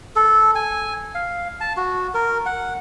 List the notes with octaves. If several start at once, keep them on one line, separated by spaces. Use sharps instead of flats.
A4
G#5
F5
A5
F#4
A#4
F#5